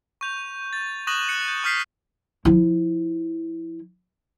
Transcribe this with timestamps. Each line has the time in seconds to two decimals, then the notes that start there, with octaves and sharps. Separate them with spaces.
0.21 C#6 G6 F7
0.73 A6
1.07 C#6 D#6 F#6 A#6 E7 F#7
1.29 F#6 C#7
1.48 G6
1.64 C#6 D#6 F6 G6 B6 C7
2.45 F3 E4